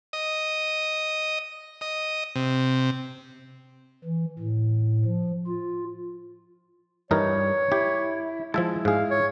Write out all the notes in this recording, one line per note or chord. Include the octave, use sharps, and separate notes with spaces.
D#5
D#5
C3
E3
A2
F3
F4
G2 E3 G3 D#4 A#4 C#5
E4 G4
F3 G#3 E4 E5 A5
G#2 G#4 F5
C#5